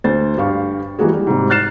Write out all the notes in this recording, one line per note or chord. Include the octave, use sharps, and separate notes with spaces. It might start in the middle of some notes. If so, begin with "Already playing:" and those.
D2 C5 A6
G2 G4 F5 C#6
E3 G3 G#3 A#3 F#4 G#4
G3
G#2 C3 G3
F6 F#6 A6 C7 E7